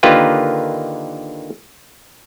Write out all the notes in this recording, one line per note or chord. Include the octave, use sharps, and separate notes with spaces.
D3 D#3 A#3 F4 G4 B4